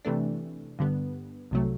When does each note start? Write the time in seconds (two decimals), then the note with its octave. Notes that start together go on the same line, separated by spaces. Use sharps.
0.05 C3 E3 A3 D4
0.79 G2 D3 G3 B3
1.51 C2 C3 F#3 A3